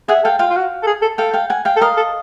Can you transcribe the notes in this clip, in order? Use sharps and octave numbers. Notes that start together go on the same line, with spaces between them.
G#4 E5 F#5
A4 F5 G5
F4 F5 G5
F4
F#4
A4
G#4
A4
A4 F5 G5
F5 G5
F#5 G#5
F5 G5
A4
A#4 D#5 F5
A4